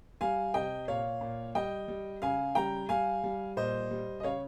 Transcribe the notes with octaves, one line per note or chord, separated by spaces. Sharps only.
G3 F5 G#5
C3 D#5 G5
A#2 C#5 F5
A#2
G3 D#5 G5
G3
C#3 F5 G#5
G3 G5 A#5
G3 F5 G#5
G3
A#2 C5 D#5
G3
D#5
C#3 C#5 F5